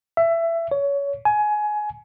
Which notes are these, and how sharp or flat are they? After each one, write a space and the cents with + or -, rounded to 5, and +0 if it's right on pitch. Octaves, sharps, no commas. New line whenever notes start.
E5 +20
C#5 +25
G#5 +20